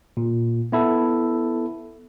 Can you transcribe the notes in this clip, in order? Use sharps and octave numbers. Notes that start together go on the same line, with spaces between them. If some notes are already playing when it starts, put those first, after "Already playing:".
A#2
B3 E4 A4